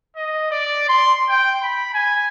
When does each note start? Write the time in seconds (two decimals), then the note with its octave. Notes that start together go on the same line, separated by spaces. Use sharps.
0.16 D#5
0.51 D5
0.89 C6
1.29 G5
1.62 B5
1.94 G#5